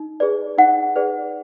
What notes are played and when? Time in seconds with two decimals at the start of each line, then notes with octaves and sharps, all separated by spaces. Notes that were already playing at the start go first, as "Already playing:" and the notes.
Already playing: D#4
0.20 G#4 B4 D5
0.58 D#4 F#5
0.96 G#4 B4 D5